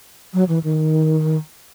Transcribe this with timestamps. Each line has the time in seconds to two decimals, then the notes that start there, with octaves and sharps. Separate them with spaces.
0.34 F#3
0.49 E3
0.64 D#3